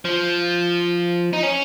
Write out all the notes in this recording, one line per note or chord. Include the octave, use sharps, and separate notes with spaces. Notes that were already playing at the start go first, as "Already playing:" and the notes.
F3
D#4
C#4